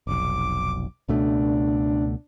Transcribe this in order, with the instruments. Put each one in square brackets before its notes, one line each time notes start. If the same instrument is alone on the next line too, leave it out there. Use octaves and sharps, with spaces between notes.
[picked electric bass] F1 B1 [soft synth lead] D6
[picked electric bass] C#2 B2 A3 [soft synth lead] D4